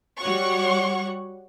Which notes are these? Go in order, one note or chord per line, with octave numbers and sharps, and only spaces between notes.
G3 F#4 C#5 F#5 C#6